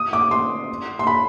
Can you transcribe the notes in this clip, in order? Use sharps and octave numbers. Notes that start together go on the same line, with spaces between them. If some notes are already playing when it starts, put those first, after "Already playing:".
Already playing: D#6
D6
C6
C6
B5